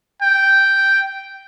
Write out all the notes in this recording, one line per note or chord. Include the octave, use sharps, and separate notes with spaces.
G5